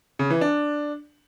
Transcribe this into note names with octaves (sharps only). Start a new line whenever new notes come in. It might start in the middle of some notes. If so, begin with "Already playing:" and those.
C#3
E3
D4